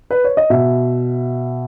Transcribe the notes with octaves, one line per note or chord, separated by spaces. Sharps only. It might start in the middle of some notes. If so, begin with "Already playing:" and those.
B4
C#5
D#5
B2 E5